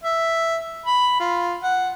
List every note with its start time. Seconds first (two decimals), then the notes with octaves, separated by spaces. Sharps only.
0.04 E5
0.86 B5
1.20 F4
1.63 F#5